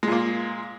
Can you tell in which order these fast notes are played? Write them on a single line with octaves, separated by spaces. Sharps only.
G#3 A#2 A#3